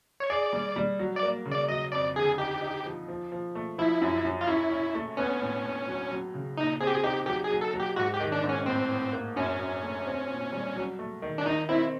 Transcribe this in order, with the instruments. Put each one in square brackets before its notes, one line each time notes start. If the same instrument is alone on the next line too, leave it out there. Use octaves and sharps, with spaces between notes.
[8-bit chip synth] C#5
[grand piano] G#4 [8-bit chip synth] D5
[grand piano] G3
G3
F#3
[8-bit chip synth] D5
[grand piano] A#3
C#3
[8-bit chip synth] D5
[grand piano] F#3 [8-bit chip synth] D#5
[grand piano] F2 [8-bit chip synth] D5
[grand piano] D3 [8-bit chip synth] G#4
[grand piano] D#4 [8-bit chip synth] G4
[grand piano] D#4
F3
F3
F3
A3
[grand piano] F3 [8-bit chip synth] E4
[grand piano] F#2
F#2
[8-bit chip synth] F4
[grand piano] C#4 [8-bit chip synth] E4
[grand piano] C#4
A3
[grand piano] B3 [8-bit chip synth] C#4
[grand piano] A2
A2
F#3
F#3
C#3
[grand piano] A#2 [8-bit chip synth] D#4
[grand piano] C4 [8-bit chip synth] G#4
[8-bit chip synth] G4
G#4
[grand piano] D#4 [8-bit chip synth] G4
[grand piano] F#3 [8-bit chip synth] G4
[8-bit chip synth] G#4
[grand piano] F#3
[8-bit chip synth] A4
[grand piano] F#3
[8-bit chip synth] G4
[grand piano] G#2 [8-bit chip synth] F#4
[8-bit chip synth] G4
[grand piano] D#3
[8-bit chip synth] D4
[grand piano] G#2
[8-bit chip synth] C#4
[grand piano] A2 [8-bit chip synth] C4
[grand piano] A2
A#3
[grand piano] F#2 [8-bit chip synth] C#4
[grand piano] F#2
A3
C4
A#2
G3
F#3
A3
D#3
[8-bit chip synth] D4
[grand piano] D#3 [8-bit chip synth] D#4
[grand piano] C4 [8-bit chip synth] E4